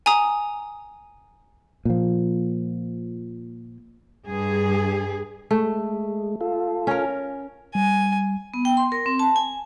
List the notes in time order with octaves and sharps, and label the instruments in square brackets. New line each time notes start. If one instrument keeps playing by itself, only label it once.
[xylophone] G#5 A#5 D#6
[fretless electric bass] A#2 F3
[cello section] G2 G#4
[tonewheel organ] G#3 [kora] A3
[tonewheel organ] F4 A4
[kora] C#4 A#4
[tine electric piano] G3 [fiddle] G#5
[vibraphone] B3
G5
C6
A#4
C4
A5
G#5